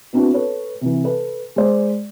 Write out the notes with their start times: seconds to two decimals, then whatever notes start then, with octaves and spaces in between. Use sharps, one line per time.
0.13 B3 C4 D4 E4 F#4 B4
0.34 A4 B4 C#5
0.81 C3 E3
1.04 A4 B4
1.56 G#3 C5 D5